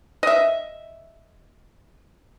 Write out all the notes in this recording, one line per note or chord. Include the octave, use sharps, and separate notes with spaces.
D#5 E5